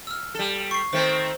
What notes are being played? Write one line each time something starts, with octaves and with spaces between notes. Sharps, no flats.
E6 F6
G3 A4
C#6 C7
D#3 A3 C4 C5